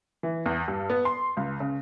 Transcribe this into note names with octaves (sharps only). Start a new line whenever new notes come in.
E3
E2
G2
B3
C6
C#2
C#3